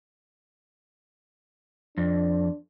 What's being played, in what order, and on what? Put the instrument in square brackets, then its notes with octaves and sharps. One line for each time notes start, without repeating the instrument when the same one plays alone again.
[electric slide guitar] F2 [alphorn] D4